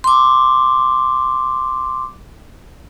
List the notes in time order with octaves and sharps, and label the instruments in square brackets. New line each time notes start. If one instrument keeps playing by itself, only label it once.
[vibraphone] C6 D6